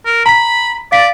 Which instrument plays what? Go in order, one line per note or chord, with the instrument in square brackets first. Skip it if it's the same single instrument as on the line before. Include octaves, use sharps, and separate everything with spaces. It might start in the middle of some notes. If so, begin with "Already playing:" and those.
[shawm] A#4
[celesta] A#5 B6 [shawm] B5
[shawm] D5 [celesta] F5 A6 B6